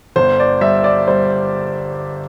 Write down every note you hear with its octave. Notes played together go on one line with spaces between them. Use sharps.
G1 C5
D5
G3 E5
D5
G3 C5